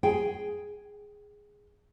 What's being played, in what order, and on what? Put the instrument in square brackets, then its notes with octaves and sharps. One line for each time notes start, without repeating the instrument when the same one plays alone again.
[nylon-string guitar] G#4 G5